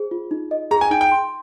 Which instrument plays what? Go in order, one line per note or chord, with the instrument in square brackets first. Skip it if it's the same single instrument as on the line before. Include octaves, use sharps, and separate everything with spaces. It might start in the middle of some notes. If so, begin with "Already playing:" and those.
Already playing: [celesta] G#4 C5
F4
D#4
D#5
[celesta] G#4 [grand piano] A#5
[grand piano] G#5
[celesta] D#4 [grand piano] G5
[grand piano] G5
[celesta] C6